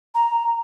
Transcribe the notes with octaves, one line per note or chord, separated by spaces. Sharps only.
A#5